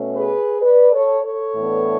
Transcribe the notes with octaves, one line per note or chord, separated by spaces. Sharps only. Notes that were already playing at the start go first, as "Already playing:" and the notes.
Already playing: B2 A3 C#4
G#4 B4
B4 D5
A4 C#5
A4 C#5
A2 E3 B3 D4